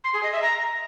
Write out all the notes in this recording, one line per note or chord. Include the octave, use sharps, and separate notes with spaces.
C6
G#4
D#5
E5
A#5